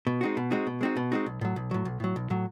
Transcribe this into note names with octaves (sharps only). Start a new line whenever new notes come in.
B2
G#3 C4 D#4 F#4
B2
G#3 C4 D#4 F#4
B2
G#3 C4 D#4 F#4
B2
G#3 C4 D#4 F#4
B1
A2 F#3
B1
A2 F#3
B1
A2 F#3
B1
A2 F#3